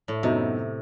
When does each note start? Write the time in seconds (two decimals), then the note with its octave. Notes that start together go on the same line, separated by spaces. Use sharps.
0.08 A2
0.23 F#2 C3 F#3 B3 D#4